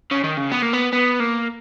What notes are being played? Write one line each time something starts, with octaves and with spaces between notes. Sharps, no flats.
C#3
D#3
C#3
B3
A#3
B3
B3
A#3